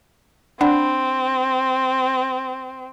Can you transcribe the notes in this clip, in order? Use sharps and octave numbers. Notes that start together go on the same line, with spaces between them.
C4 D4 F#5 B5